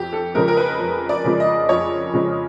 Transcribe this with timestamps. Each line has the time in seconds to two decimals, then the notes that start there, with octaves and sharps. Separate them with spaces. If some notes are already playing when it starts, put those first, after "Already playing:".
Already playing: F2 G4
0.13 A4
0.35 C#3 F3 G#3 A#4
0.48 A#4
0.57 B4
0.79 F2
1.09 D5
1.24 C#3 F3 G#3
1.40 D#5
1.69 F2 C#5
2.13 C#3 F3 G#3